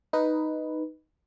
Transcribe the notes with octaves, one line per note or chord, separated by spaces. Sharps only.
D#4 B4